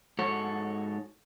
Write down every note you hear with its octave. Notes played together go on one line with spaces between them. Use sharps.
G#2 F#4 A4 C#5